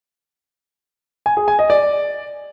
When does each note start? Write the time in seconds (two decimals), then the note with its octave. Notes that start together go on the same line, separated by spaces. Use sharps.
1.26 G#5
1.37 G#4
1.48 G#5
1.59 D#5
1.70 D5